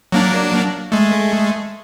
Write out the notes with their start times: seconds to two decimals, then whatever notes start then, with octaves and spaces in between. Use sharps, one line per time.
0.12 F#3 A#3 D4
0.92 G#3 A3